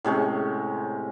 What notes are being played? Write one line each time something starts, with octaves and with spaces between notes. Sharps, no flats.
A2 C3 G#3 C#4